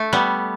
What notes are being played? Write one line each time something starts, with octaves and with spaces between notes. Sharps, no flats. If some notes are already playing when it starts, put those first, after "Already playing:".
Already playing: A3
G3 B3